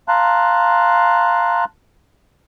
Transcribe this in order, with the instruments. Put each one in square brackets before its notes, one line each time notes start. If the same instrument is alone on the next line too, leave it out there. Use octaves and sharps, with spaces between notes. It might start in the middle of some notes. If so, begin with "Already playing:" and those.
[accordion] F5 A5 A#5 C6 F#6